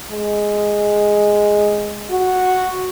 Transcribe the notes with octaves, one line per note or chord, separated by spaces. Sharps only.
G#3
F#4